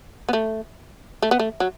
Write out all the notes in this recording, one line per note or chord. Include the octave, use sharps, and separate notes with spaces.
B3
A3
A3
B3
A3
F#3